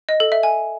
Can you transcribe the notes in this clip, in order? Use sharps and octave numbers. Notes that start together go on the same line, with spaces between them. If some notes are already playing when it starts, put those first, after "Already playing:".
D#5
A4
E5
G#5